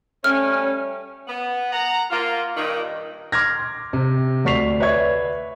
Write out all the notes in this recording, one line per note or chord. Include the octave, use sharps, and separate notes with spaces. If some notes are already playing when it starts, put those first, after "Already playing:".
G3 A3 C#4 F6
B3
F#5 A#5
A#3 F4
G2 A#2 D#3
C6 D6 F6 G#6 A#6
C3
D2 D5 C#6 B6 C7 F7
B4 C#5 D5 E5 C#6 G#6